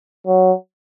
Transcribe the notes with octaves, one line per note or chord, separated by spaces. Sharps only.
F#3